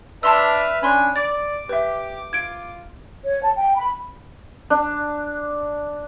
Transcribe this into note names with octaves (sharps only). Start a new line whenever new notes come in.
D4 B4 E5 A5 C6 E6 F6
C#4 D4 G#5 B5 C6
D5 D6 A6
G4 B4 E5
F4 G#6 D7
C#5
A5
G5
B5
D4